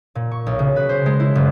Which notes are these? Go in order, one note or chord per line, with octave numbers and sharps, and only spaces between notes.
A#2
C#6
B1
C#3
B4
C5
G#3
E4
F#1